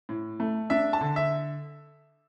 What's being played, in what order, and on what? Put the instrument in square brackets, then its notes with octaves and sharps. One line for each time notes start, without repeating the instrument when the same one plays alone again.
[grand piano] A2
A3
D4 E5
A5
D3
E5